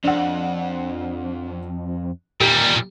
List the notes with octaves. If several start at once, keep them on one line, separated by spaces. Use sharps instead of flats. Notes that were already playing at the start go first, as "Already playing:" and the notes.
F2 D4 F#5
D#2 A#2 G3 G4 A#4